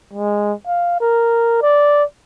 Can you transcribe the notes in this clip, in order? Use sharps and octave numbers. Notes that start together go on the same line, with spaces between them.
G#3
F5
A#4
D5